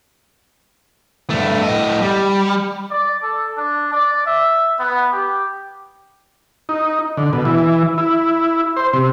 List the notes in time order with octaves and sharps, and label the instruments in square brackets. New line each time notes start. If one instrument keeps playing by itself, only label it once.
[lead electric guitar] G2 A3
A2 D#5
G3
[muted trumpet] D5
A4
D4
D5
E5
B3
G4
[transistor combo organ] D#4
D3
B2
E3
E4
C5
C3